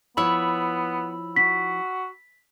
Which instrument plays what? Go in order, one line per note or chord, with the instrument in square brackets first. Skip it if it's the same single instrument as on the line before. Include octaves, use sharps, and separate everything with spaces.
[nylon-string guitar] F3 E4 C#5 [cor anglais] B3 [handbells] B5 E6
[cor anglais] F#4 [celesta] B6